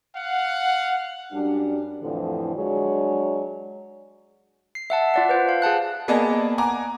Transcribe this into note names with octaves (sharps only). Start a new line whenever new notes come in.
F5 F#5
F#2 G3 D4
F2 A2 D3 E3 F3
F#3 G#3 D4 G#4 C#5
C7
E5 F#5 A5
F4 D5 F#5
B4 C5
F5
G#4 F#5 A5 F#6
A#3 B3 G#4 D5 D#5 A5
F#5 G#5 A#5 D6